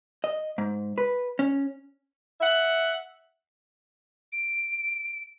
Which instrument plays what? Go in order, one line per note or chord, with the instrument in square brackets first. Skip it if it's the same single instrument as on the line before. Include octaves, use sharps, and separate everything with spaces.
[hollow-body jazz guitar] D#5
G#2
B4
C#4
[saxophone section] E5 F#5
[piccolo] D7